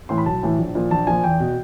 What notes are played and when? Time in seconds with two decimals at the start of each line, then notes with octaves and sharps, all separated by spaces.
0.09 A2 E3 C6
0.18 B5
0.26 B1 A5
0.43 A2 E3
0.59 A#1
0.75 A#2 F3
0.91 A#1 A5
1.07 A#2 F3 G#5
1.24 E2 G5
1.40 B2